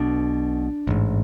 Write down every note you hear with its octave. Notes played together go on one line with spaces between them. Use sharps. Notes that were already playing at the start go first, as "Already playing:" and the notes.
Already playing: B1 B2 D4
A1 G#2